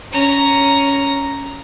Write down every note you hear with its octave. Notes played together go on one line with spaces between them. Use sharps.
C#4 A#5